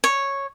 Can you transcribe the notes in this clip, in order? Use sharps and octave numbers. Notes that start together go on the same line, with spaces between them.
C#5